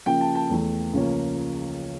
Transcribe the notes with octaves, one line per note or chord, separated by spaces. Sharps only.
C#3 F3 A#3 G5
A5
A5
E2 E3 A3
C#2 C#3 F3 A#3 C#4